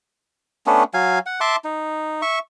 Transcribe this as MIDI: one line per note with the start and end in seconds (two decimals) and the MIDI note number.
0.66 0.83 57
0.66 0.83 59
0.66 0.83 61
0.66 0.83 62
0.94 1.19 54
0.94 1.19 77
0.94 1.19 80
1.26 1.40 78
1.41 1.56 76
1.41 1.56 81
1.41 1.56 84
1.41 1.56 86
1.64 2.21 63
2.22 2.39 76
2.22 2.39 85